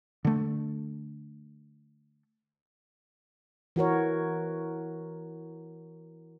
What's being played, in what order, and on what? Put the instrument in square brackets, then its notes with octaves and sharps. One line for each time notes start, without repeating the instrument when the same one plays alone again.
[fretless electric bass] D3 A3
[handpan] E3 F#4 A#4 C#5